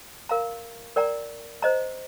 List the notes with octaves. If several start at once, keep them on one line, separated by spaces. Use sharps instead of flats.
A#4 F5 A#5
A#4 D5 G5 A#5
C5 D#5 A#5